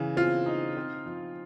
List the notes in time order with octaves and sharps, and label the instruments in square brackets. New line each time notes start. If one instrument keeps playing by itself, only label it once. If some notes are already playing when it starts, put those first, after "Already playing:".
Already playing: [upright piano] C#3 E3
[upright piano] C4 [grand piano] F4
[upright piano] D#4
C4
F3